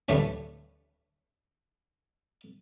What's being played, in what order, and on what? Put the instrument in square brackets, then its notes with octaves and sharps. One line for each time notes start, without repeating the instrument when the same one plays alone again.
[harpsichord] D2 A2 D3 E3 G3 A3